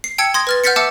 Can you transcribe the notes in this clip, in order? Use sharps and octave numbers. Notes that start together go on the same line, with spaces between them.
C7
G5 A5 E6 G#6 C#7 D7
C6 D#6 G#6 A#6
B4 F6 A6
F#5 F6 G6 A6 B6 C#7
E5 F#5 A5 D6 E6 F6